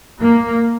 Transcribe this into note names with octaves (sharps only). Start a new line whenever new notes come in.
A#3